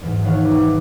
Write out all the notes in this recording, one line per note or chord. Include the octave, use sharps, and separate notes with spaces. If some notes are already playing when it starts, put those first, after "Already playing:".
E2 G#2
E1 D#3 E4 C#5 F5 F#5
B1 B4 D6
F#5